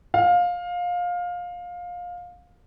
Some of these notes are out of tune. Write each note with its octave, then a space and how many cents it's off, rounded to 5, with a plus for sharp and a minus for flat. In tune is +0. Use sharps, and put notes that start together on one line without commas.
F5 +20